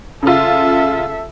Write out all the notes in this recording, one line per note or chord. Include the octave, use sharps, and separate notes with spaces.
C#3 F4 A4 E5